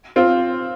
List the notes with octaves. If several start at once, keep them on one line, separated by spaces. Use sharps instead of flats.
C4 F4 C5